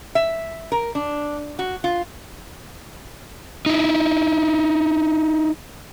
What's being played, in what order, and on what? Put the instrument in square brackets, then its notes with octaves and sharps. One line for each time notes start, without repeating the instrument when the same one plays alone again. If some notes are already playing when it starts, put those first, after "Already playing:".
[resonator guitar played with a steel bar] E5
A#4
D4
F#4
F4
[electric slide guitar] D#4 E4